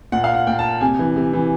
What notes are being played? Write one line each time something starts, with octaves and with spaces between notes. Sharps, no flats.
A#2 F#5
F5
F#5
A#2 G5
A5
C3 G#5
E3
C3
E3